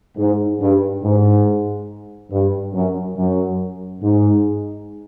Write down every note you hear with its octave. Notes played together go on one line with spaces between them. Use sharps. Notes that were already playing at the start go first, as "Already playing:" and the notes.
G#2
G2
G#2
G2
F#2
F#2
G#2